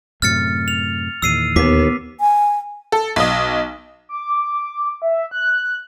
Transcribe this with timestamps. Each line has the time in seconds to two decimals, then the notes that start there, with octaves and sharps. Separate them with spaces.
0.22 F#2 A2 C3 F6 A6 C#7
0.68 F7
1.22 E2 A#2 D#3 E6 C7 D#7
1.56 D#2 B3 D6 B6
2.20 G#5
2.92 A4
3.16 B1 D#5
4.09 D6
5.02 E5
5.31 F#6